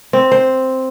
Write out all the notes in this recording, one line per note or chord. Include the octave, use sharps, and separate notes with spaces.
C4
C5